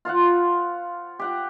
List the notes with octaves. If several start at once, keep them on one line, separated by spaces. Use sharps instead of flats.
F4 C5 F5 F#5
G4 F#5 G5